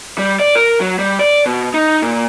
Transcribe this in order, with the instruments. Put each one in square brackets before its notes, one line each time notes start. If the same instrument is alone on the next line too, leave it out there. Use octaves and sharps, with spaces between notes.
[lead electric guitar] G3
D5
A#4
F#3
G3
D5
B2
D#4
A#2